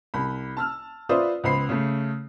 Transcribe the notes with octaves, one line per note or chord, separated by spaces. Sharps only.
C2 B5
A5 E6 F6
F4 B4 C5 D5 E5 D#6
C#2 B3 C5 B5 C7
C#3 A3